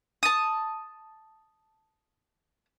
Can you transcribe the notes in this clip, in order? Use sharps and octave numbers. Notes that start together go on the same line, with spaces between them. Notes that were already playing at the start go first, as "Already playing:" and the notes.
A5 D#6